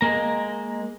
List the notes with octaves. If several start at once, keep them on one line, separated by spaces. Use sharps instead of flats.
G#3 A#3 A#5